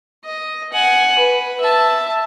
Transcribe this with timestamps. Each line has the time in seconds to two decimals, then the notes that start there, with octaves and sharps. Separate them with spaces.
0.25 D#5
0.72 F#5 G#5
1.19 B4
1.60 E5 A5